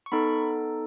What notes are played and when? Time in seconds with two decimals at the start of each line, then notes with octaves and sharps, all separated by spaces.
0.06 C#6
0.12 B3 D#4 A4 B5